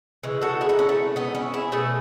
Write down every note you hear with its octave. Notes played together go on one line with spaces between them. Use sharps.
C#3 E3 G#3
F#4 A4
E4 G#4
D#4 F#4
C#4 E4
A3
B3 D#4
C#4 E4
E4 G#4
B2 A3 E4 G#4